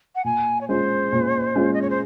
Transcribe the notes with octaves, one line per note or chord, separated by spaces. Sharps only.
F#5
A#2 G#5
C#5
G#3 C#4 F4 C5
A#2
G#3 C#4 F4
D#5
C#5
C5